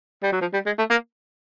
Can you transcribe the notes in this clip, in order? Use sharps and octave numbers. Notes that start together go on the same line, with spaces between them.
G3
F#3
F3
G3
G#3
A3
A#3